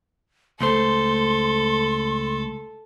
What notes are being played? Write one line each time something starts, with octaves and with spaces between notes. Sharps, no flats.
C#2 A3 A4 C5 C6